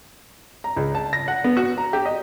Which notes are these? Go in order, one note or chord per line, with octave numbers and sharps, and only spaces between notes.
A#5
C#2
A5
A#6
F#5
B3
F#4
A#5
G4
D#5